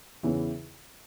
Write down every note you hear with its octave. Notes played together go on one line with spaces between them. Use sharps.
E2 C#3 E3